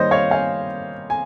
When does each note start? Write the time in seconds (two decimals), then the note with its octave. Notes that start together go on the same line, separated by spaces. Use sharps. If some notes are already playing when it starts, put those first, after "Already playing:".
Already playing: D#3 G3 A#3 C5 C#5 D#5
0.11 C#5 F5
0.31 F5 G#5
1.10 G#5